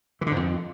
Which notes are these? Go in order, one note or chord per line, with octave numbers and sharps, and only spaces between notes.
E3
D3
G#2
F2